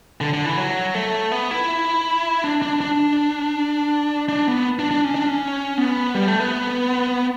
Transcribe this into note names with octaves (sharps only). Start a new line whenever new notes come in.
D3
D3
E3
F#3
A3
B3
E4
D4
D4
D4
D4
B3
D4
D4
C#4
D4
C#4
B3
G3
A3
B3